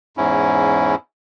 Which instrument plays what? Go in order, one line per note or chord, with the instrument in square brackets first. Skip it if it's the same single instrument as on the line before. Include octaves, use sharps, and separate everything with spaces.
[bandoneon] E2 G#2 C#4 E4